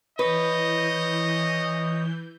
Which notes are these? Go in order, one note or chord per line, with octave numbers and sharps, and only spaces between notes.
E3 B4 C#5 D#5 G6